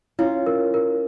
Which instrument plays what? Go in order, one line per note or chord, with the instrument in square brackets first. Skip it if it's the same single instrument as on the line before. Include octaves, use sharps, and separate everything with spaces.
[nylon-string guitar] C#4 F4 [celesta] E4
[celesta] A#4
A#4